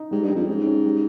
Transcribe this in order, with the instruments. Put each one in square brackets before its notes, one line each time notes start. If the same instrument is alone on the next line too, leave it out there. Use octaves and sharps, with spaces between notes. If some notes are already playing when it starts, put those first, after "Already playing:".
Already playing: [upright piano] D#4
[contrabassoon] G#2 [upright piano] G3
[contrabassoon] G2
[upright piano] G3
[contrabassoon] F2
[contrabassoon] G#2 [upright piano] C#4
[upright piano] C#4
G3